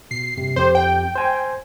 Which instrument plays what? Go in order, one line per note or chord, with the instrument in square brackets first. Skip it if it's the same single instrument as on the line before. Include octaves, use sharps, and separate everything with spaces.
[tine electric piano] B2 [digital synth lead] C7
[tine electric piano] G2 C3
[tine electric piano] F2 G4 [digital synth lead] C5
[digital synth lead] G5
[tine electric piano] C5 G#5